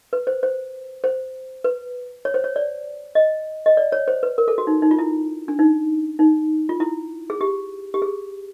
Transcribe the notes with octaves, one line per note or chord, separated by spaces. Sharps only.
B4
C5
C5
C5
B4
C#5
C5
C#5
D5
D#5
D#5
D5
C#5
C5
B4
A#4
A4
F#4
D#4
D#4
F4
E4
D4
D#4
D#4
F4
E4
G#4
G4
G4
G#4